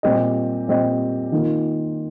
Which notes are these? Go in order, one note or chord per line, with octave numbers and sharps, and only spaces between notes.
A#2 G3 C4 G4 D#5
A#2 G3 C4 G4 D#5
D#3 A#3 F4